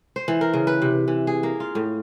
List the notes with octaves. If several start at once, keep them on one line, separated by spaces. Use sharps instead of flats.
C5
E3
A#4
C#3
B4
C3
E3
G#4
A#3
F4
A2